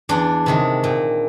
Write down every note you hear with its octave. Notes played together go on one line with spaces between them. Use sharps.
E2 D4
C3 D#3 G#3
A#2